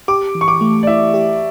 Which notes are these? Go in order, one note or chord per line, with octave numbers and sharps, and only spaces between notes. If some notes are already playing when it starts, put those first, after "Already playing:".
G4 D6
E3
C#6
D6
A3
D5
E4 E5
G4